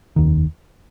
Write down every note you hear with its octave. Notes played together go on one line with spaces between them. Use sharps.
F1 D#2 D#3